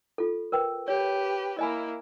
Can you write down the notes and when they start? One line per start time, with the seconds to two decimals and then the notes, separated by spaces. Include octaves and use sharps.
0.18 F4 A4
0.52 A#4 B4 G5
0.88 G4 B4 C#5
1.59 A#3 E4 D#5 G#5 B5